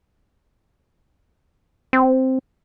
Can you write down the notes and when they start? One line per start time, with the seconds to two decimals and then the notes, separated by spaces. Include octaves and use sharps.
1.93 C4